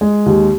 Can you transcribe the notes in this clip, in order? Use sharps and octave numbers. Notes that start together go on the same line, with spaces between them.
G#3
D#2